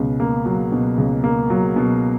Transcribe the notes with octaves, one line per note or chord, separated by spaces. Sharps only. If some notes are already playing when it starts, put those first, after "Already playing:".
Already playing: C#2 B2
A#3
F#3
B2
C#2
A#3
F#3
B2